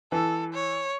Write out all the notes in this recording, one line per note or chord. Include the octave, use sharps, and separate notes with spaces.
E3 A4
C#5